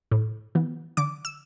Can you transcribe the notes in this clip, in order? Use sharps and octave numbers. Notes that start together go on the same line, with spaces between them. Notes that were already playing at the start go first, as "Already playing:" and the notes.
A2
E3 B3
D3 D6
E6